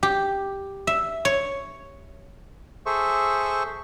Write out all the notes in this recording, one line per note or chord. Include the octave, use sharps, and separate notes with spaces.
G4
E5
C#5
G#4 A4 C5 E5 C#6